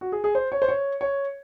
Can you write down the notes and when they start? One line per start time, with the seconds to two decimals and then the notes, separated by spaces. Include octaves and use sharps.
0.01 F#4
0.12 G#4
0.24 G#4
0.35 C5
0.52 C#5
0.62 C5
0.68 C#5
1.01 C#5